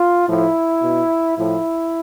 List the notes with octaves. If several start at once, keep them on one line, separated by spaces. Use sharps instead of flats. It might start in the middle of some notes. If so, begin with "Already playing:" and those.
Already playing: F4
A2 F3 E4
B2
A2 F3 E4